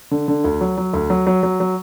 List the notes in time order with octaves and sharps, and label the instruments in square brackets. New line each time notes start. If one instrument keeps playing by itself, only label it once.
[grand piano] D3
D3
D2
F#3
F#3
D2
F#3
F#3
F#3
F#3